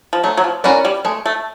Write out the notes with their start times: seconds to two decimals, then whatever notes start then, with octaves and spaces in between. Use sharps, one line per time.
0.13 F3
0.23 F#3 A3
0.37 F#3
0.44 F3
0.64 E3 C#4 F#4 A#4 D5
0.85 G3
1.05 G#3 A3
1.26 A3